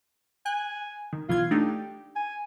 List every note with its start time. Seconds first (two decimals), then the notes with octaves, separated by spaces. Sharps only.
0.46 G#5 F#6
1.13 D#3
1.29 B1 E3 F4 G#6
1.51 A3 D4 D#4 G4
2.16 G#5